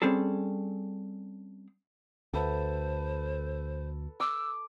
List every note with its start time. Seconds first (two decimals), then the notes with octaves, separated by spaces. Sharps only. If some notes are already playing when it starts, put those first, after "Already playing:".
0.02 G3 C4 C#4 G#4 A4
2.33 D2 A4 B4 C5
4.20 D6 E6